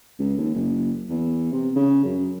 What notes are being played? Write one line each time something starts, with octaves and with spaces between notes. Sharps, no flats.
C#2
D#2
F#1
E2
C3
C#3
F#2